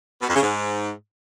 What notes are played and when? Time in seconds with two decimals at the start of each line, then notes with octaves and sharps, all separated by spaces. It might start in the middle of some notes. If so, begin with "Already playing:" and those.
0.21 B2
0.28 F2
0.35 C#3
0.42 G#2